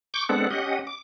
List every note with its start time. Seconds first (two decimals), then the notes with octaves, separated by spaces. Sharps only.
0.14 C#6 D6 G6
0.29 G#3 B3 C4 D4 A4 F#5
0.51 C#4 G4 D#5 F#5
0.87 D6